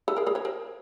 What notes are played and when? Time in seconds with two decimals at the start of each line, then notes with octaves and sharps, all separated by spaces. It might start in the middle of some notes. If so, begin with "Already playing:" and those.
0.08 A4 B4
0.16 G#4 A#4
0.26 G#4 A#4
0.35 B4 C#5
0.45 A#4 C5